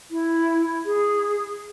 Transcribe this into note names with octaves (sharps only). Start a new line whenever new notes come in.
E4
G#4